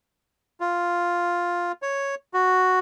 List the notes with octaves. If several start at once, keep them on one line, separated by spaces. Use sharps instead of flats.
F4
C#5
F#4